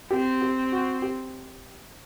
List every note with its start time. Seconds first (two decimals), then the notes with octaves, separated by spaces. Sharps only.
0.11 C4 G4
0.41 G4
0.72 F#4
1.02 G4